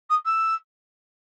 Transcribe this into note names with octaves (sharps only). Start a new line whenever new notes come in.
D#6
E6